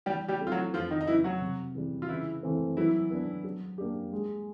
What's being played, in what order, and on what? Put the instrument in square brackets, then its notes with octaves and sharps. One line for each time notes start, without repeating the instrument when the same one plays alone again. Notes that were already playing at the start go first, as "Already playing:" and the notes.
[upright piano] E3 [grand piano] G3 G4
[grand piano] G3 G4
[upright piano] A3 C4 E4
[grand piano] F4
F#3 F#4
[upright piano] F2 [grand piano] F3 F4
[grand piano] D#3 D#4
D#4
[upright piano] C#3 F#3 [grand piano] E3 E4
[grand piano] F#3 F#4
[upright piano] C3
E3 G3 C4
[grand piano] F4
[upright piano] C#3 [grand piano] E3 E4
[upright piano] E3 A3 C4
[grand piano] E3 E4 [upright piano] F#3
[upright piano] B3 D4
F#3
A#3 D4 G4
G#3